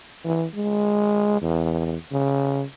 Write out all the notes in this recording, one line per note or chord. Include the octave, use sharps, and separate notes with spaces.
E3
G#3
E2
C#3